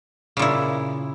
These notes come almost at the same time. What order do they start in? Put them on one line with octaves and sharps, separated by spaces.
C#3 A#2 E4